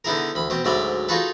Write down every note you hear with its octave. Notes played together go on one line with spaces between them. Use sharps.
D3 B3 D#4 E4 G#4 A#4
D2 B5
B2 C4
D2 G#2 F#3 D5 E5 B5
D#4 F4 F#4 G#4 A4 B4